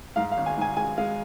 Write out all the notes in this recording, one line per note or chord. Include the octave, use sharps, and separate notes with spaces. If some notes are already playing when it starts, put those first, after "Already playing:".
G#2 F5
F5
G#1
G#5
G#2 G#5
G#3 G#5
G#3 F5